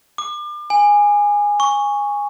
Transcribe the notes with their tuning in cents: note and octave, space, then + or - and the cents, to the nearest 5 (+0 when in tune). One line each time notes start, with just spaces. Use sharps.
D6 +35
G#5 -10
C#6 +5